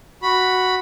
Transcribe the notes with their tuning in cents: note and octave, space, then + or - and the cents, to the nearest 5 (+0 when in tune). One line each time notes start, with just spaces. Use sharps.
F#4 +0 B5 +0